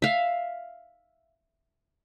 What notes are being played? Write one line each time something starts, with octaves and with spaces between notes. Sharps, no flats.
E5 F5